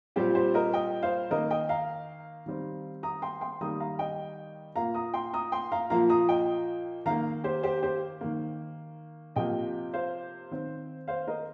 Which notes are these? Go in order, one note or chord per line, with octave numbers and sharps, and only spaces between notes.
A#2 G3 C4 G4 C5
G4 C5
A#4 D#5
D#5 G5
C5 F5
D#3 A#3 A#4 D#5
D#5 G5
F5 A#5
D#3 G3 C4
A#5 D#6
G5 C6
G5 C6
D#3 G3 A#3 A#5 D#6
F5 A#5
D#5 G5
A#2 A#3 F5 A#5
A#5 D#6
G5 C6
A#5 D#6
G5 C6
F5 A#5
A#2 F3 A#3 F5 A#5
A#5 D#6
D#5 G5
D#3 A#3 F5 A#5
G4 C5
G4 C5
G4 C5
D#3 A#3
C3 F3 A#3 D#5 G5
C5 F5
D#3 C4
C5 F5
A#4 D#5